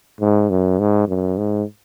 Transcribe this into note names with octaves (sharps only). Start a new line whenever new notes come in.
G#2
F#2
G#2
F#2
G#2